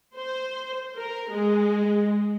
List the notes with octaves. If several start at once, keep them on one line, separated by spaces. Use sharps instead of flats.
C5
A#4
G#3